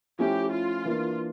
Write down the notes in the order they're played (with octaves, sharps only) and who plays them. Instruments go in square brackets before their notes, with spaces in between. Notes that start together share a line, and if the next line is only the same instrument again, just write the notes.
[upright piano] F3 A3 C#4 E4 [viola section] G4
[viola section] F4
[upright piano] E3 A#3 D4